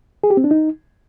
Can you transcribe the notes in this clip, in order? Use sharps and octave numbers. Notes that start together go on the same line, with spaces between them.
G#4
G4
C4
D4
D#4